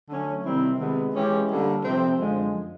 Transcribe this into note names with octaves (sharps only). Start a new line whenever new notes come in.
D3 F#3 A3 C#4
C3 D#3 G3 C4 E4
C3 D#3 G#3 B3
E3 G#3 C#4 E4 G4
D3 G3 A#3
C3 F3 A3 C4
F#2 D3 F3 G#3